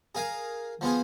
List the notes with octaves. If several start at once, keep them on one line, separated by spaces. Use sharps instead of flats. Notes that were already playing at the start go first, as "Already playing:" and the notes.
G#4 A#4 F5 G#5
F3 B3 F4 G#4